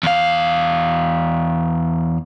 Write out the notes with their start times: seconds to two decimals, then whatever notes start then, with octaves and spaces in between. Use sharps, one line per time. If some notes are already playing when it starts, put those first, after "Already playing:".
0.03 E2 F5